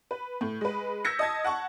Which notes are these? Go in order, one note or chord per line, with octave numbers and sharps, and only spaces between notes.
B4
A2
G#3 B4
E6 G6 G#6 A#6 B6 C#7
D#5 A5 G#6
F#5 A5 C#6